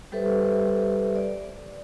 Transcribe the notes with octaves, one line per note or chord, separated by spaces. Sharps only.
G3 G4 A4 B4 C5 E5
D5